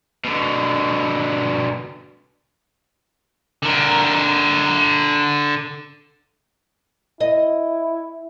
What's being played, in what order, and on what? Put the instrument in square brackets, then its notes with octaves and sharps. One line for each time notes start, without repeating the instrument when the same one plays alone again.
[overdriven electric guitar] B2 D3
[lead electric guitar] D3 A#4
[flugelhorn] E4 [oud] D#5